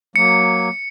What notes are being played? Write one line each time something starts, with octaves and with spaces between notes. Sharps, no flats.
F#3 A#3 C#7